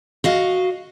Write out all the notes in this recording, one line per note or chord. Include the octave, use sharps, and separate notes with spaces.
F#4 D#5 F5